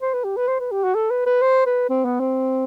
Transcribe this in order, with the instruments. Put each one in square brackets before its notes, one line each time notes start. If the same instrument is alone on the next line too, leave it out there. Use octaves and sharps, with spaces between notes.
[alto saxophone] C5
B4
G4
B4
C5
B4
G4
F#4
A4
B4
B4
C5
B4
C4
B3
C4